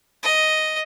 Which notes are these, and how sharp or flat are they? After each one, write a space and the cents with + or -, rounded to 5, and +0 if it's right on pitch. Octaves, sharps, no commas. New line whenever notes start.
D#5 +5